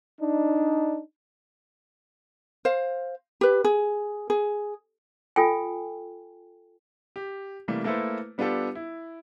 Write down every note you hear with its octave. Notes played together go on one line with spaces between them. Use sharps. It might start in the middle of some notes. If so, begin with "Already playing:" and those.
D4 D#4
C5 F5
G4 B4
G#4
G#4
F4 A4 G5 G#5
G4
C3 E3 G3 A3 A#3
A3 A#3 E4 A4 B4 C5
G3 B3 D4 F4 G4 A4
E4